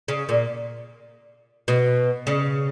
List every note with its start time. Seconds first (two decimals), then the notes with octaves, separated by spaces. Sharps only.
0.08 C#3
0.29 A#2
1.68 B2
2.27 C#3